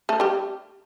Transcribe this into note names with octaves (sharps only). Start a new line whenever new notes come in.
A3 A4
G3 G4